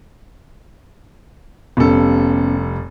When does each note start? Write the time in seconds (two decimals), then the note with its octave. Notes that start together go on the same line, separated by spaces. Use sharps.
1.77 F1 G3 B3 C#4 A4